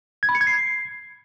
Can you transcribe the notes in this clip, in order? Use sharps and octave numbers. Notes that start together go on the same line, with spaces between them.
G#6
B5
C#7
G#6
C7